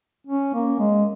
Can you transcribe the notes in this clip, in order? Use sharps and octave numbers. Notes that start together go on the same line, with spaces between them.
C#4
A#3
G#3